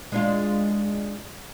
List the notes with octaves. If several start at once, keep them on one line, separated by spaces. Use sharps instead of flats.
G#3 D4 F4